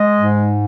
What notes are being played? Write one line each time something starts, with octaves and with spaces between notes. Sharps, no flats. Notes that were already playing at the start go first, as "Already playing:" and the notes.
Already playing: G#3 D#5
G#2